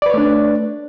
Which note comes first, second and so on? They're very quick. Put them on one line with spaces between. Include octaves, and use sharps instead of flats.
D5 B4 C#5 A3 D4